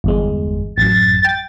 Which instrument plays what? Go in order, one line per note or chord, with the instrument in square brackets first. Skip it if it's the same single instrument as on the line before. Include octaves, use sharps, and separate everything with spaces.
[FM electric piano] G1 E2 G#3
[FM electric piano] A1 F#2 [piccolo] A6
[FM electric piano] G5 A6